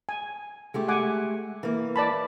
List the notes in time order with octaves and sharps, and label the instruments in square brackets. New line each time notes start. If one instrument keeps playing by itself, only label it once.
[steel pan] G#5
[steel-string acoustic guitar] G#3 A3 G4
[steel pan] F#5 G#5 D6
[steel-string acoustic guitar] E3 A#3
[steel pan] D5 A5 B5